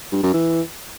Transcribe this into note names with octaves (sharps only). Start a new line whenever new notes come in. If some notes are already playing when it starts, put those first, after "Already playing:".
G2
F#2
E3